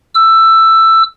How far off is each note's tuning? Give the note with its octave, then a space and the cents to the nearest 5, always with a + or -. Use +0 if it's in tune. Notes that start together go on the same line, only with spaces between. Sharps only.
E6 +10